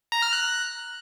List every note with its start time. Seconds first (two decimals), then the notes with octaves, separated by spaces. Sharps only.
0.12 A#5
0.22 F6
0.33 F#6